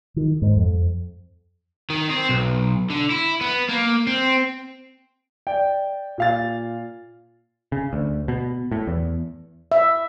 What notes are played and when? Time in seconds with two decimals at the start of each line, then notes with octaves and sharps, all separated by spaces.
0.16 D#3
0.42 G#2
0.56 F2
1.90 D#3
2.09 C4
2.29 B1
2.90 D3
3.10 E4
3.41 B3
3.69 A#3
4.07 C4
5.47 D5 G5
6.18 A#2 F5 A6
7.72 C#3
7.93 D2
8.28 B2
8.71 A2
8.87 E2
9.72 E5